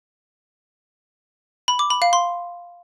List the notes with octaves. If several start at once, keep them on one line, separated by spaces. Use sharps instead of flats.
B5
D6
B5
F5
C6